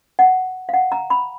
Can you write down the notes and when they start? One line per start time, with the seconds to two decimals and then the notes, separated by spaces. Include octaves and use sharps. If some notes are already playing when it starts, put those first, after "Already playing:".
0.19 F#5
0.69 F5
0.73 F#5
0.92 A#5
1.10 B5